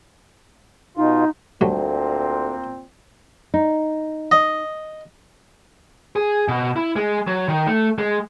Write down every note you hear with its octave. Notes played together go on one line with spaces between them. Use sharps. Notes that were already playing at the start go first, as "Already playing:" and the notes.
B2 D#4 F4
D2 A#2 F#3 G3 A3 C4
D#4
D#5
G#4
B2
E4
G#3
F#3
D#3
A3
G#3